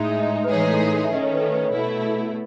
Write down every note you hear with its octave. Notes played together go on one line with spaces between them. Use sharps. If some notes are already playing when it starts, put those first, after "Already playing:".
Already playing: A2 G#3 D#4 E5
E5
D#5
B4
A2 E3 G#3 D#4 G#4 C#5
B4
A4
E5
D#3 A3 C#4 D#5
C#5
B4
A4
B4
C#5
B2 A3 E4 B4
G#4